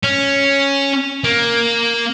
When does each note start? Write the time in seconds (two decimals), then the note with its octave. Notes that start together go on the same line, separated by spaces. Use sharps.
0.04 C#4
1.24 A#3